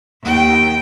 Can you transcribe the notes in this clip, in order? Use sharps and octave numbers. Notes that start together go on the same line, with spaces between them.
D#2 G5